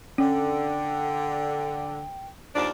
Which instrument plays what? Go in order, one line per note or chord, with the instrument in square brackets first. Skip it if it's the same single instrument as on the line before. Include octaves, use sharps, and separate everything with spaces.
[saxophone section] D3 [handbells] C#4 [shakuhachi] G5
[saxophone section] D#2 F3 D4